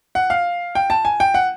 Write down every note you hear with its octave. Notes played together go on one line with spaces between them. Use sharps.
F#5
F5
G5
A5
G#5
G5
F#5